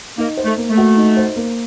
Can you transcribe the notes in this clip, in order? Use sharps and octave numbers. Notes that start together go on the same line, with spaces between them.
A#3 D#4
C5
A3
A#3
A3
F#4
D#4
C5
A#3